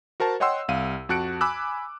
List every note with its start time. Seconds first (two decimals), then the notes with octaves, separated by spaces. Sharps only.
0.20 F#4 A#4 C5 A5
0.40 C#5 D#5 F#5 G5 C6 E6
0.68 C2 F5 D#7
1.09 F2 F#4 A5 F#6 C#7 D7
1.41 G#5 B5 D6 E6 F#6